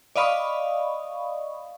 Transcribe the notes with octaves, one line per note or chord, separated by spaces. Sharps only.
D5 D#5 F5 B5 C#6 D#6